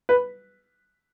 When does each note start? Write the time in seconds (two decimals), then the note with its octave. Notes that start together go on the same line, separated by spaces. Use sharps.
0.09 B4